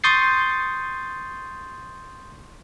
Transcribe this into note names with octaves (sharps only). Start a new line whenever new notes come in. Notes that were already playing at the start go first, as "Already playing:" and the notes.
C6 C#6 D#6 G6 A6 C7